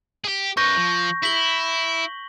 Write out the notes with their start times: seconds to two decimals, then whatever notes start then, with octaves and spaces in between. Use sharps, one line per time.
0.24 G4 G#4
0.57 F#2 B4 C#6 G6 A#6
0.77 F3
1.23 E4 B6 F#7 G7